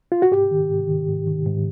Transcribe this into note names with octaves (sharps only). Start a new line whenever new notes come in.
F4
F#4
G#2 G4
D#3
G#2
D#3
G#2
D#3
G#2